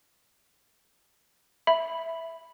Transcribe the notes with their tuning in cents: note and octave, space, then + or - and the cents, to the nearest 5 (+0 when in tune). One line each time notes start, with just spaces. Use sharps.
E5 +0 B5 +0